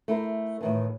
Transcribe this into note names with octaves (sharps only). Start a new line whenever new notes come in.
A3 E4 A#4 C5
A2 D#3 E3